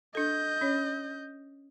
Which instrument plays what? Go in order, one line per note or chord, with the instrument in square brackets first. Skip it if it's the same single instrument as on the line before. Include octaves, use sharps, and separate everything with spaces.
[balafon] D4 A4 [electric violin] D#5 G6
[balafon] C#4 C#5